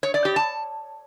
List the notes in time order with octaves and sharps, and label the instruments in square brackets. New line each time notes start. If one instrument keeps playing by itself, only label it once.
[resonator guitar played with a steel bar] C#5
D5
G4
A5